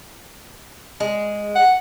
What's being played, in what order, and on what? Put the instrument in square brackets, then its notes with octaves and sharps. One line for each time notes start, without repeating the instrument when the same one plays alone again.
[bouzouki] G#3
[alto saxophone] F#5